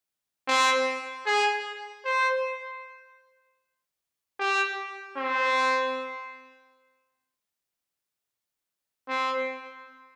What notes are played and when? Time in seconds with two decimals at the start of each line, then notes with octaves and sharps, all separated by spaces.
0.48 C4
1.26 G#4
2.05 C5
4.40 G4
5.17 C4
9.08 C4